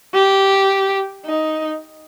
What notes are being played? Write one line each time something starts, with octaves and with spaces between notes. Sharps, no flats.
G4
D#4